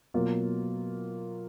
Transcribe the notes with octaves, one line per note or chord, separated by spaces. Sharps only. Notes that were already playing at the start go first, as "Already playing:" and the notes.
B2 F#3 A#3 F4